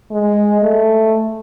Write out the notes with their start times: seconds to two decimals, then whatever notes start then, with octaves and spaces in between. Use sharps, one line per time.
0.11 G#3
0.62 A3